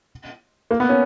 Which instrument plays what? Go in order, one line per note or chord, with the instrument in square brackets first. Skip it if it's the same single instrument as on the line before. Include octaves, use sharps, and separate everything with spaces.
[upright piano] A#3
B3
C#4